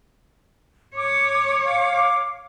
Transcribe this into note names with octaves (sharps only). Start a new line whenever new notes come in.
C#5 D6
F5 D6